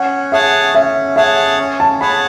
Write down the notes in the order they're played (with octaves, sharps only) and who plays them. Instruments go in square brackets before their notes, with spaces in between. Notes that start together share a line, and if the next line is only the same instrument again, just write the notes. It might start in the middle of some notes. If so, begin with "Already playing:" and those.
Already playing: [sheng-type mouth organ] C#4 [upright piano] F#5
[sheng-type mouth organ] G#4 C#5 F#5 A5 [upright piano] E5
[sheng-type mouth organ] C#4 [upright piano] E5
[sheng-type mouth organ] G#4 C#5 F#5 A5 [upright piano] E5
[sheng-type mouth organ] C#4
[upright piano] A5
[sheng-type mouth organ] G#4 C#5 F#5 A5 [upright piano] B5